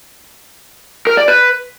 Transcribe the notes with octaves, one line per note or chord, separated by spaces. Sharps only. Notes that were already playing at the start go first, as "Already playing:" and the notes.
A#4
D5
B4